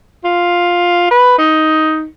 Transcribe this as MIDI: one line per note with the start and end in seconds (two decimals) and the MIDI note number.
0.24 1.08 65
1.11 1.36 71
1.39 2.05 63